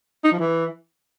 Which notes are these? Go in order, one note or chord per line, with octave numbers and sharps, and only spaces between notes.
D#4
F3
E3